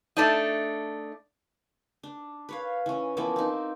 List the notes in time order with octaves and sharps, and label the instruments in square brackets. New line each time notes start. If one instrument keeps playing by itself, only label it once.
[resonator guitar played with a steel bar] A3 D4 D#4
[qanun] D4
B4 C#5 F5
E3 C#4
E3 F3 A#3 B3
C4 D#4